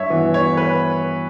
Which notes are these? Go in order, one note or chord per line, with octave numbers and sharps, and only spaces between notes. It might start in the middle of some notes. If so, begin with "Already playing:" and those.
Already playing: G2 C#5 E5
E3 B3
C#5
B4